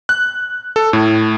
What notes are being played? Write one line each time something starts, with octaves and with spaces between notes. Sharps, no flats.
F#6
A4
A2